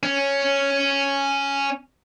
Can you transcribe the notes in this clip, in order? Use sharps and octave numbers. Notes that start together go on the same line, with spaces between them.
C#4